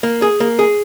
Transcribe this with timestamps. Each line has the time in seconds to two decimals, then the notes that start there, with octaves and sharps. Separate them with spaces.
0.03 A#3
0.22 G#4
0.40 A#3
0.59 G#4